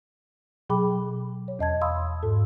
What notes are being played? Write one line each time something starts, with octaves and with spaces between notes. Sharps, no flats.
B2 F#3 G#4 G5 B5 D6
C#5
E2 D#5 A5 G#6
F5 B5 C6 D#6 E6
G#2 A4